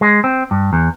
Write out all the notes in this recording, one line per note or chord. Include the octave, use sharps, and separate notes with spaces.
G#3
C4
G2
E2